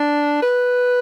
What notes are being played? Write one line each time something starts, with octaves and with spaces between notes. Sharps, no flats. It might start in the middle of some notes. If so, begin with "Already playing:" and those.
Already playing: D4
B4